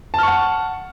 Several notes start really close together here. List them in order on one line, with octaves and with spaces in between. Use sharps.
A5 F6 C#6 F#5